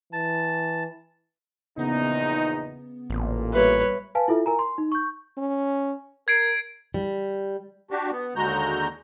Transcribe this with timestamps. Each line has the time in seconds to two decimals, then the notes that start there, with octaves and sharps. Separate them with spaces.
0.13 E3 A5
1.78 A#1 E2 C#3 B3 D#4
3.10 A1 A#2
3.53 G3 B3 B4 C#5 E5
4.15 B4 F5 G#5 A5
4.28 E4 F4 A4 E5
4.46 A#4 G#5 A#5
4.59 C6
4.78 D#4
4.92 C#6 G6
5.37 C#4
6.28 A#4 G#6 C7 D7
6.94 G3
7.91 D4 F#4 G4
8.12 B3
8.36 D#2 D3 G#3 F#4 A#5 G6